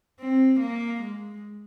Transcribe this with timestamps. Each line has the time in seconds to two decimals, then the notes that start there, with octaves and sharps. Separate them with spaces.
0.20 C4
0.60 A#3
1.02 G#3